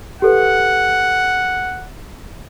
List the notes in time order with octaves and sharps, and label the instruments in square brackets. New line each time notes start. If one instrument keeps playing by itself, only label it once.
[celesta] G4 A4 B4 [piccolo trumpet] F#5